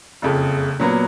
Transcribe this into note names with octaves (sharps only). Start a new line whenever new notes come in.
F#1 F2 C#3
A#2 F#3 B3